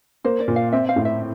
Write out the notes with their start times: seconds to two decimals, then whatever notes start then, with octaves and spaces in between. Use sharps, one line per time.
0.24 A#3 C5
0.40 D5
0.48 A#2
0.56 F5
0.72 C4 E5
0.89 F5
0.96 A2
1.05 E5